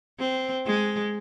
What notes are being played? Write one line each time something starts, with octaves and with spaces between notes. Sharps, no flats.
C4
G#3